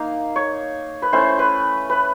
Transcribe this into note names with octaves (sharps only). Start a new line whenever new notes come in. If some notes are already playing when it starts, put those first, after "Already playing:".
Already playing: A#3 D#4 F5
C#5
B4
A3 C#4 E4 C5
B4
B4